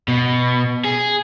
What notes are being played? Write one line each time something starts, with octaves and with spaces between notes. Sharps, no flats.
B2
G#4